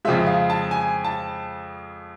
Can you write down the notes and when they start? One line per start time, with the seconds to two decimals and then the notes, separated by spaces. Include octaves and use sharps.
0.05 F2 C#3 F3 G#3 E5
0.26 F5
0.50 A5
0.71 G#5
1.05 A5